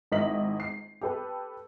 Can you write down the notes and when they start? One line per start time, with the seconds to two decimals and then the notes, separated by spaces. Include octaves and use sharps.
0.12 G#1 E4 A#4 D#5 B6 F#7
0.60 C7
1.01 G4 A4 B4